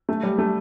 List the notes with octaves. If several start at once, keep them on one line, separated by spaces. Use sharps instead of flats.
A3
G3
A3